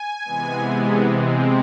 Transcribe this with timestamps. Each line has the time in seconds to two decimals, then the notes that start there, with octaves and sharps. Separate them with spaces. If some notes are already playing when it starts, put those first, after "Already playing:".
Already playing: G#5
0.25 C3 E3 G#3 B3
1.06 C3 G#3 C4